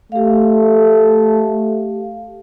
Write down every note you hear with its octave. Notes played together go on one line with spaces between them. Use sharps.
A3 G4 F5